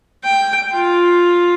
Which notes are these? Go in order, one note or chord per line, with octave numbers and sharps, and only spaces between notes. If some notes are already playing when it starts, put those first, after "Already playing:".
G5
F4